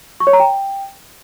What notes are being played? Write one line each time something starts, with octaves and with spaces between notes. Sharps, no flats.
C#6
C#5
A#5
G5